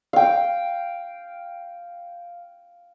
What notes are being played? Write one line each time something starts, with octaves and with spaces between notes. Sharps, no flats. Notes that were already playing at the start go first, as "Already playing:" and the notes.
F5 G5